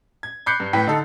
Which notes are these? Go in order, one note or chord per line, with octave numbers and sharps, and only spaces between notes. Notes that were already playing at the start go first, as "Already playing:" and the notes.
G#6
B5 D6 F#6 G6 C7 C#7
G2
A2 E3 G5 B6
D3 D#4 A4